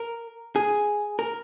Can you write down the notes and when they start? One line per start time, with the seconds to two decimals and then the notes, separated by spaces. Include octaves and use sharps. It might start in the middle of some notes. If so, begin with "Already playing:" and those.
Already playing: A#4
0.56 G#4
1.19 A#4